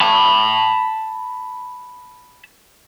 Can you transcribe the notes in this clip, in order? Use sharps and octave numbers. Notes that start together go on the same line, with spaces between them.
A5 B5